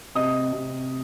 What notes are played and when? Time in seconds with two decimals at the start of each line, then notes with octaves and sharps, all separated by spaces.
0.15 C3 D#5 D#6
0.52 C3